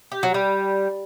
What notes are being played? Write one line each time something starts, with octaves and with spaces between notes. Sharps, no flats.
G4
F#3
G3